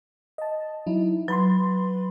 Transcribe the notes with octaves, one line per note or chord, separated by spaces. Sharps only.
D#5 A5
F#3 D#4 E4
F#3 B4 B5 C6